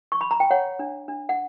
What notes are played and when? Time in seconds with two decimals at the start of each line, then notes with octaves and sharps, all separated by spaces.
0.12 C#6
0.21 B5
0.31 A#5
0.40 G5
0.51 C#5 F#5
0.79 D4
1.08 D4
1.29 F#5